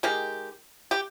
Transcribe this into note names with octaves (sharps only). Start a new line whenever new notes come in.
D#3 G#3 G4
G4